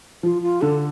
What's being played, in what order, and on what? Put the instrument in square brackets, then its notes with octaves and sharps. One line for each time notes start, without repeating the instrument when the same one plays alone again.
[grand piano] F3 [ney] F4
[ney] F4
[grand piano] D3 [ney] A4